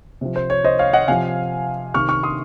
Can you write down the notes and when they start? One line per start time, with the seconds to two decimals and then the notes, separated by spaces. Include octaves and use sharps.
0.21 C3 F3
0.36 C5
0.50 C#5
0.64 C5 D#5
0.79 C#5 F5
0.93 D#5 F#5
1.08 C3 F3 F5 G#5
1.94 C3 D#3 C#6 F6
2.09 C#6 F6
2.23 C6 D#6